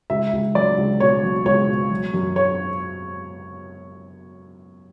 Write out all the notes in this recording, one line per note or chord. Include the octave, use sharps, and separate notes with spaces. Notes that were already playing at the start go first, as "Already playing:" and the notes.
C#2 E5
C#2
F#3 D5
C#2
B2 C#5
F#3
C#2 C#5
B2
F#3
F#2
C#5